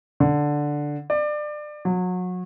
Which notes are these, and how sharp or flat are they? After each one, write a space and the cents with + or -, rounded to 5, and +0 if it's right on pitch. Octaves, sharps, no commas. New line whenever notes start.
D3 +0
D5 +25
F#3 -30